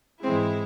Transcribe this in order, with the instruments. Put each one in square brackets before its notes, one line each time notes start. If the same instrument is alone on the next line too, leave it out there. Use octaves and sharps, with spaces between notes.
[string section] G#2 E3 G#3 E4 [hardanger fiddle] C4